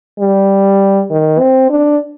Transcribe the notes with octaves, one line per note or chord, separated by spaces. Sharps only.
G3
D#3
C4
D4